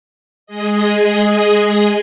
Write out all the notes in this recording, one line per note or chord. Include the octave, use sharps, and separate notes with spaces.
G#3 G#4 D#5